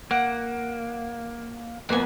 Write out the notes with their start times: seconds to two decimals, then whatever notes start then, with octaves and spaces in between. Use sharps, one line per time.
0.11 A#3 F#5
1.89 F2 A#3 B3 F#4 G#5